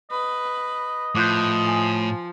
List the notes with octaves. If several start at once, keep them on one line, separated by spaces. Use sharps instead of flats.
B4 D#5
A2 F3 D6 F#6 G6
G#5